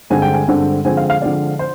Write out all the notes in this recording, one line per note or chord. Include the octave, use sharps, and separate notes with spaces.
G2 D3 G#3 C4 G#5
G5
G#5
G2 D3 G#3 C4
D3 F3 G#3 C4 G#5
F5
F5
D3 F3 G#3 C4 D5
C5